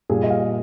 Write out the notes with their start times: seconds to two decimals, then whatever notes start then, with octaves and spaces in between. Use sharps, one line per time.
0.09 A#2 G3 G#4
0.23 D#5
0.30 F5